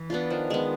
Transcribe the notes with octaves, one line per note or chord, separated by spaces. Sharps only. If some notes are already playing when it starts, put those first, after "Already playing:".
Already playing: E3
B3 D4 F4
D#3 F3
G#3 B3